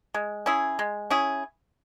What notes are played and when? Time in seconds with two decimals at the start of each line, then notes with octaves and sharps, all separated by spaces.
0.14 G#3
0.46 C#4 E4 G#4
0.79 G#3
1.10 C#4 E4 G#4